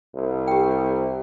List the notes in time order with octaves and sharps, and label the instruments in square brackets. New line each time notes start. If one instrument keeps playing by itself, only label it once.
[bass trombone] C2
[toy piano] G4 G5